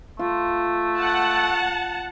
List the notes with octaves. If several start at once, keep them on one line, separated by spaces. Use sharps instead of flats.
A3 F4
F#5 A5